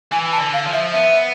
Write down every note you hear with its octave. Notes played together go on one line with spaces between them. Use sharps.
E3 G#5
A5
D3
F5
F3
E5
B3 E5